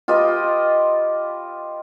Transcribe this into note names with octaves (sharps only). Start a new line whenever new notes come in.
F4 G4 B4 D#5